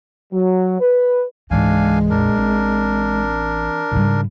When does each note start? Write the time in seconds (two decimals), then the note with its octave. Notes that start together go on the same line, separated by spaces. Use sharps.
0.33 F#3
0.80 B4
1.51 C#2 G#2 E3 G#3 D4 F5 G#5
2.10 A#1 F2 D4 A#4
2.36 A1 E3 C4
3.91 G#2 C#3 G3